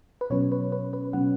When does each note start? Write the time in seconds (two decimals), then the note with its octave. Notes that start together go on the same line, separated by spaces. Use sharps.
0.21 B4
0.30 B2 F#3 C#4 C#5
0.52 B4
0.72 B4
0.93 B4
1.13 B2 F#3 C#4 F#5